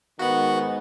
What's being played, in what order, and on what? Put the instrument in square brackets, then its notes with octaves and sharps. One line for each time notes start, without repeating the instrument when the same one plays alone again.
[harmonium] G#2 [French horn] D#3 [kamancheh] B3 [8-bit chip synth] F#4 F#5